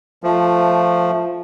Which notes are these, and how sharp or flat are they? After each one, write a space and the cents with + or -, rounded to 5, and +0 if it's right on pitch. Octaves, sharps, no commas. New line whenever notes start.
F3 +0 A3 +0